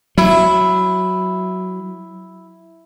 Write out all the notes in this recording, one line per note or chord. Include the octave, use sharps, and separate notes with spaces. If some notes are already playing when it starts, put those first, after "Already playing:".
F#3 E4